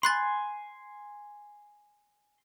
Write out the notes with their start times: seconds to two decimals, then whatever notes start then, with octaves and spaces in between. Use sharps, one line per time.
0.03 G#5 B5 C6 F#6 A6